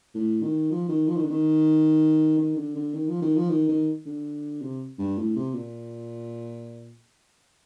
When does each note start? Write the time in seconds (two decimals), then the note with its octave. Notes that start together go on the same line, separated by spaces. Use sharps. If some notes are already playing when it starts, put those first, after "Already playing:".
0.14 A2
0.43 D#3
0.71 F3
0.89 D#3
1.08 F3
1.16 D#3
1.24 D3
1.30 D#3
2.38 D#3
2.57 D3
2.75 D3
2.94 D#3
3.08 F3
3.22 D#3
3.36 F3
3.49 D#3
3.69 D#3
4.06 D3
4.61 C3
4.98 G2
5.18 A2
5.36 C3
5.54 A#2